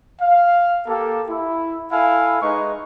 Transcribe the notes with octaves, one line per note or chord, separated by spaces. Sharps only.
F5
A#3 G4 A4
E4
E4 A4 F5 G#5
G#3 D#4 B4 C#6